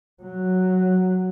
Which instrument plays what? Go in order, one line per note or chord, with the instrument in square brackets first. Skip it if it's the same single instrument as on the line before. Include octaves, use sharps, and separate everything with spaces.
[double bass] F#3